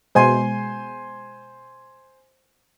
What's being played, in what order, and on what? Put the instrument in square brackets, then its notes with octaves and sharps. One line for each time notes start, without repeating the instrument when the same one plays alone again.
[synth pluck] B2 G#3 [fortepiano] C5 G#5 C6